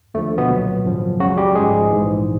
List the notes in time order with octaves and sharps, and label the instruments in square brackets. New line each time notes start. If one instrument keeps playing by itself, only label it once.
[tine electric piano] D#2 D3 F3 A3
B2 B3
C2 A#2 F#3
G#1 F#2 C#3 F3
C#2 C#3 F#3 F#4
G3 G4
A1 G#2 F3 G#3 G#4
A#1 G#2 E3